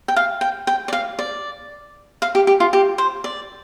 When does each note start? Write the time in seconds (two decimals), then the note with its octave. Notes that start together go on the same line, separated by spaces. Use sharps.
0.08 G5
0.16 F5
0.41 G5
0.67 G5
0.88 D5
0.93 F5
1.19 D5
2.22 F5
2.35 G4
2.47 G4
2.60 F4
2.73 G4
2.98 C5
3.24 D5